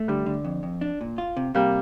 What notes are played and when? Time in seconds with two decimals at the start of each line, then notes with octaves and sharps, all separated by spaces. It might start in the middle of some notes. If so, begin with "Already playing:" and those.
Already playing: A3
0.08 D3 G3
0.26 D3
0.45 F2
0.63 F2
0.81 D4
1.01 A#2
1.18 F4
1.37 C3
1.54 C3 G3 A#3